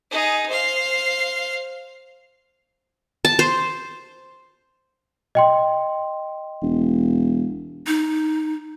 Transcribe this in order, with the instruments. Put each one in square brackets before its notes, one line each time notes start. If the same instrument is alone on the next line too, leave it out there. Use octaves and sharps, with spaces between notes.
[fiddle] D#4 G#4
C5 F5
[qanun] A5
C5
[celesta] D#5 G5 C6
[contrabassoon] E1
[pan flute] D#4